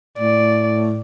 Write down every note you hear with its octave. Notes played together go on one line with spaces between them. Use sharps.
A2 D5